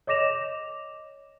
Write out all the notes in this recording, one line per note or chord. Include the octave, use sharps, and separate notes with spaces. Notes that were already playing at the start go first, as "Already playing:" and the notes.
C#5 D#5 D6 A#6 E7 F7